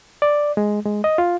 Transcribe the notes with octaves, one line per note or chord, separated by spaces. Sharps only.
D5
G#3
G#3
D#5
F4